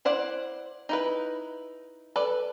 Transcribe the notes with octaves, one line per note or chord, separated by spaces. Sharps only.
E4 C5 D5 F#5
D#4 E4 B4
A4 B4 D5